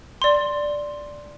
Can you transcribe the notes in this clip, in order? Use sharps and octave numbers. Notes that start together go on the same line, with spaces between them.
D5 C6